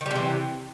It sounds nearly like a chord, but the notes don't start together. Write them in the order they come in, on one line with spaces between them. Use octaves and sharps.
D#3 G3 C3 E3